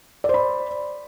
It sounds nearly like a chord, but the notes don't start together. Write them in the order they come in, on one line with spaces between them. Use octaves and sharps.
D5 C5 B5